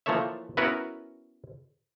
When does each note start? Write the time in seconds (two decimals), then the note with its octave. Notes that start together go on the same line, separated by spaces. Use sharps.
0.06 E3 F3 A3 A#3 C#5 E5
0.57 B3 C#4 E4 F#4 A#4 B4